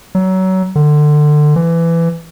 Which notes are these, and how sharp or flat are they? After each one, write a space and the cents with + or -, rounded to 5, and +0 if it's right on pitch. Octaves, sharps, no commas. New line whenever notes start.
F#3 +25
D3 +25
E3 +20